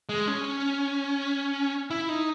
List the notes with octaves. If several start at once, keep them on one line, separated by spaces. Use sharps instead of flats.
G#3
C#4
E4
D#4